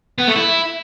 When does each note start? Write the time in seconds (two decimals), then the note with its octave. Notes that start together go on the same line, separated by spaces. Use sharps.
0.18 B3
0.27 A3
0.36 E4